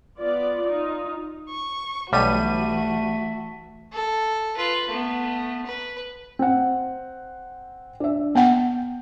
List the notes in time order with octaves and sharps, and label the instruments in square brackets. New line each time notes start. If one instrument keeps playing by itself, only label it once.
[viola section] B3 F4 D5
D#4 F4
[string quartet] C#6
[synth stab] B1 G3 D#7 [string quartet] E3 F#4 [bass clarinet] A3
[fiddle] A4
F4 B4
A3 B3
B4
[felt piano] C4 F#5
D4 E5
[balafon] B3 F#5 [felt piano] G5